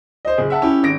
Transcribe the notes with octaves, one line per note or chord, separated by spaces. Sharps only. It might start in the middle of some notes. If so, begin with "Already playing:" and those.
C5 D#5
F#1 G#4
E5 F#5 A5
C#4 E4 G4
G#1 A#6 D7